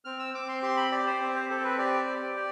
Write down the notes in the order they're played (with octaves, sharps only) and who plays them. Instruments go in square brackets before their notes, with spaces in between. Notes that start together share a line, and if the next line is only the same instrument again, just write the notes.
[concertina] C4 F6
E6
C4 D6
C6
G4 C6
B5
G4 D5
C5
C4
C5
C4 A4
B4
G4 D5
G4
G4